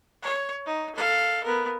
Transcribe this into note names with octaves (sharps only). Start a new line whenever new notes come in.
C#5
D#4
A4 F5
B3 A#4